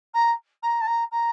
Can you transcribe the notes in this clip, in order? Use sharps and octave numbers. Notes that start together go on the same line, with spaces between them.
A#5
A#5
A5
A#5
A#5